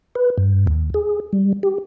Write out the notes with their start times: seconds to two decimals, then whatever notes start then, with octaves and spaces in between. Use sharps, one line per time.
0.15 B4
0.38 G2
0.67 D#2
0.94 G#4
1.33 G3
1.63 G4